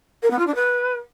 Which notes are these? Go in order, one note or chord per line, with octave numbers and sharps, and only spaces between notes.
A#4
B3
F4
D4
B4